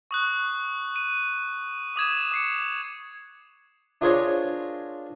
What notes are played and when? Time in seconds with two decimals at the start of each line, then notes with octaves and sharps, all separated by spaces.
0.11 C#6 D#6 F#6
0.96 D#7
1.96 D6 D#6 G#6 E7
2.32 D6 C7 C#7
4.01 D4 F4 G#4 A#4 C5 C#5